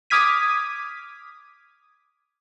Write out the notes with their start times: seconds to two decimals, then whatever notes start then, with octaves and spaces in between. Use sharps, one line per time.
0.10 D6 D#6 F6 G#6 B6 D#7